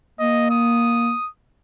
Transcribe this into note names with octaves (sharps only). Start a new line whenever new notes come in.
A#3 D#5
D#6